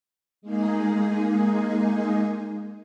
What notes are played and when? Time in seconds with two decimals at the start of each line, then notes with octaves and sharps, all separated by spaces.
0.42 G#3 A#3 D#4 G#4